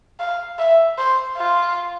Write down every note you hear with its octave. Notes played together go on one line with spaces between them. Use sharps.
F5
E5
C5
F4